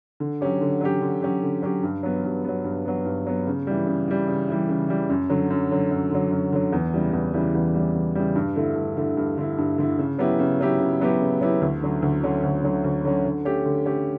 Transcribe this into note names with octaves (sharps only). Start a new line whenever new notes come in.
D3
F#3 C#4 G4
D3
F#3 C#4 G4
D3
F#3 C#4 G4
D3
F#3 C#4 G4
G2
F#3 B3
G2
F#3 B3
G2
F#3 B3
G2
F#3 B3
C#3
E3 G3
C#3
E3 G3
C#3
E3 G3
C#3
E3 G3
F#2
D3 F#3
F#2
D3 F#3
F#2
D3 F#3
F#2
D3 F#3
E2
C#3 E3 G3
E2
C#3 E3 G3
E2
C#3 E3 G3
E2
C#3 E3 G3
G2
D3 A3 E4
G2
D3 A3 E4
G2
D3 A3 E4
G2
D3 A3 E4
C#3
F#3 B3 E4 G4
C#3
F#3 B3 E4 G4
C#3
F#3 B3 E4 G4
C#3
F#3 B3 E4 G4
D2
D3 F#3 C#4
D2
D3 F#3 C#4
D2
D3 F#3 C#4
D2
D3 F#3 C#4
D3
A3 C#4 G4
D3
A3 C#4 G4